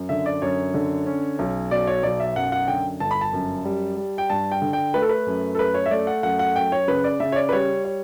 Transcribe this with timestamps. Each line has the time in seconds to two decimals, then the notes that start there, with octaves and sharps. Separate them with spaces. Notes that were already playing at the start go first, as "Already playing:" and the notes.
Already playing: F#2
0.09 D3 E5
0.26 D5
0.42 F#2 C#5
0.74 D3
1.07 C#4
1.39 B1
1.71 B2 D5
1.87 C#5
2.03 B1 D5
2.20 E5
2.35 F#2 F#5
2.52 F#5
2.68 D3 G5
3.00 G1 A5
3.11 B5
3.21 A5
3.33 F#2
3.65 G3
3.97 G3
4.18 G5
4.30 G2 A5
4.52 G5
4.62 D3
4.73 G5
4.94 A3 B4
5.02 A4
5.09 B4
5.26 F#2
5.55 A4
5.59 A3 B4
5.74 C#5
5.86 E5
5.91 A3 D5
6.07 F#5
6.23 F#2 F#5
6.39 F#5
6.56 F#2 G5
6.72 C#5
6.88 C#3 B4
7.04 D5
7.20 C#3 E5
7.32 C#5
7.36 D5
7.49 B4
7.52 G3 C#5
7.85 C#5